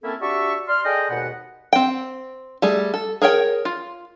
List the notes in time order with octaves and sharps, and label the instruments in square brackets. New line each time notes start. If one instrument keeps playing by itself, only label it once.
[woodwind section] A3 A#3 C4 C#4 E4 A4
D4 F#4 G4 D5 E5 C#6
D5 C6 F6
G#4 A4 D5 D#5 G5
D#2 G#2 B2 B3 F#5
[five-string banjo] C4 G5
G3 A3 G#4
A4
G#4 A#4 C#5 G5
F4